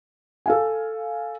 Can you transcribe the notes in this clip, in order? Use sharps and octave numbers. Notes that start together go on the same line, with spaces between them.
A4 F5 G#5